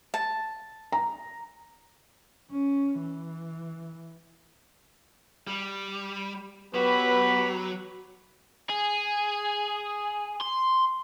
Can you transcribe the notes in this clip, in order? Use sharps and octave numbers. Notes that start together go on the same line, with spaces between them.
A5
A#5
C#4
E3
G3
F#3 B3 G4 B4 B5
G#4
C6